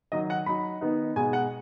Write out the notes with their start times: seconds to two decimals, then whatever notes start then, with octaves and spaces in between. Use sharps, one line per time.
0.12 D#3 F#3 D#4 D#5
0.30 F#5
0.46 F#3 D#4 B5
0.81 D#3 B3 D#4
1.16 B2 G#3 D#4 G#5
1.33 F#5